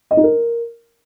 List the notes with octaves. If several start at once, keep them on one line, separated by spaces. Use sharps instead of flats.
D#5
D#4
A#4